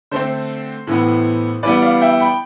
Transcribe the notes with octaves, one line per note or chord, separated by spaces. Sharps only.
D3 A3 C4 C5
A2 E3 B3
E3 G3 B3 B4 D5
D5 F5
E5 G5
G5 B5